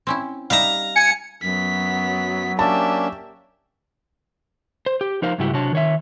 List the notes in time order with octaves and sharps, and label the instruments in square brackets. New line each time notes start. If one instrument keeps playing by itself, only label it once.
[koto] C4 C#4 E4
[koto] G3 D#4 E5 [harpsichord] F5 A#5
[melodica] G#5 [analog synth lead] C#7
[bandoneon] F#2 [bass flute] F#3 [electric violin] B3 B6
[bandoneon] A#3 C#4 D4 [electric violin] G4 E5 [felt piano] A5
[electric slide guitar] C5
G4
F3 D#4 A#4 C5 F5
G#2 C#3 G3 E4 F#4 G4
C3 F#3 D4 F#4 C#5 A5
D#3 C#5 E5